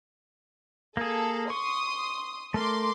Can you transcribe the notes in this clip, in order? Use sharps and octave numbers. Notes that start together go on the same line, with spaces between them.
A#3 G#4 A4
C6 C#6 D#6
A3 A#4 C6 D6